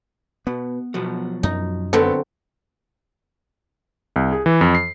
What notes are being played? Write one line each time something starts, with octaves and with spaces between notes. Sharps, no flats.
B2 B3
B2 F3 F#3
F#2 D#4
D3 F#3 B3 C4 A4
C2
G#4
E3
F2
C7